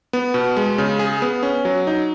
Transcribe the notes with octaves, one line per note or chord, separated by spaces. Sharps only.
B3
B2
G#3
C#3
G#4
B3
C#4
F#3
D#4